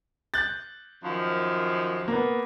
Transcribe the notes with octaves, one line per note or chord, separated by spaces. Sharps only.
F#6 G6 A6
F#2 D#3 F3
A#3 B3